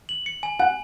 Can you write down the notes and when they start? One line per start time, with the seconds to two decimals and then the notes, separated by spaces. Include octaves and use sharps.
0.09 F#7
0.26 C#7
0.43 G#5
0.60 F#5 G#5